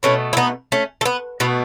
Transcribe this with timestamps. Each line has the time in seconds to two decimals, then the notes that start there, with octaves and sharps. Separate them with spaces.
0.03 B2 A3 C#4 E4
0.33 E4
0.37 B3 D#4
0.72 A3 C#4
1.01 A3
1.06 B3
1.40 B2 A3 B3